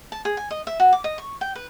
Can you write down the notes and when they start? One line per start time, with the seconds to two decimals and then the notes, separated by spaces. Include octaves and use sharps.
0.12 A5
0.25 G#4
0.37 G#5
0.51 D#5
0.67 E5
0.80 F#4
0.93 D6
1.04 D#5
1.18 C#6
1.41 G5
1.55 B4